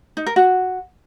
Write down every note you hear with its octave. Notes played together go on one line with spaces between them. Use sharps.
D#4
A#4
F#4